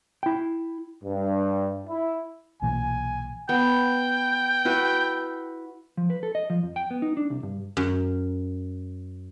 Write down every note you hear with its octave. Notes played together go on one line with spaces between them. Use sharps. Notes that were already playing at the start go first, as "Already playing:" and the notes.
E4 G5
G2
E4
B1 A#2 E3 G#5
B3 G5
E4 F#4 B4
F3
B4
A4
D#5
F3
F2
G5
B3
D#4
D4
C2
G2
F#2